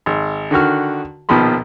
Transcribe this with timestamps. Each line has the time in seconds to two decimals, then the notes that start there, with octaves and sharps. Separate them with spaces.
0.06 G#1
0.51 D3 D#3 F#4 F6
1.29 A#1 B2 D#3 F3 B5 C6